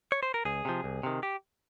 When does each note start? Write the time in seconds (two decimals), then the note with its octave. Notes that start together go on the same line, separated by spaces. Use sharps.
0.12 C#5
0.23 C5
0.34 A#4
0.45 C#2 G#4
0.65 C3 F3
0.84 C2
1.03 C3 D#3
1.23 G4